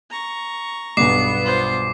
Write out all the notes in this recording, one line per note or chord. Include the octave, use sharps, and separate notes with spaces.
A#5 C#6
B1 G2 B3 D6 C7
F4 C5